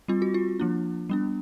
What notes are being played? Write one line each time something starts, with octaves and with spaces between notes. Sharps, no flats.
G3 C4 F4
F#4
F4
F3 A#3 D4
G3 B3 D4